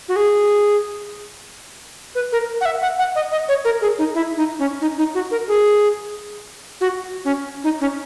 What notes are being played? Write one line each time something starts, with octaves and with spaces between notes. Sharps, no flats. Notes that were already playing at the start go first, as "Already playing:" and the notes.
F#4
G#4
B4
A#4
F#5
E5
F#5
F#5
D#5
D#5
C#5
A#4
G#4
D#4
E4
D#4
C#4
D#4
D#4
F#4
A#4
G#4
F#4
C#4
D#4
C#4